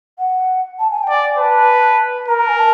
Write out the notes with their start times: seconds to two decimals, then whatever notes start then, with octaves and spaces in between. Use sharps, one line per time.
0.19 F#5
0.79 A5
0.91 G#5
1.03 G5
1.09 D5
1.15 G#5
1.38 B4 A5
2.28 A#4 A#5
2.38 A#5
2.48 G#5
2.58 A5